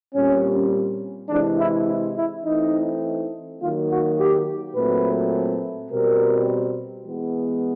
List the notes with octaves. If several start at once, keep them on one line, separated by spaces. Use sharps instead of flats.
A#2 G3 C4 C#4
C3 E3 G#3 D4
E4
E4
E4
E3 A3 C4 D#4
D#3 F#3 A#3 F4
F#4
G4
A#2 F#3 A3 C4 B4
B2 G3 C4 A#4
E3 G#3 B3